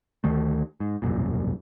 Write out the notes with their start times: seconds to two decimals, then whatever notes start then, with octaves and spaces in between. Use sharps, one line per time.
0.24 D2 D#3 A3
0.80 G#2
1.02 E1 C2 F#2 A#2